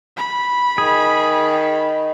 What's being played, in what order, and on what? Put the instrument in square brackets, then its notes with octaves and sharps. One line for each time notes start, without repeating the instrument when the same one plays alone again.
[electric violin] B5
[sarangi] D#3 [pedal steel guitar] G#4